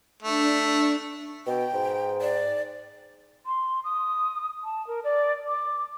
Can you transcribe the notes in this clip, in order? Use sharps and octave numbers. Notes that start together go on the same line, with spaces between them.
A3 D4
B2 G5
G#2
D5
C6
D#6
A5
A#4
D5
D6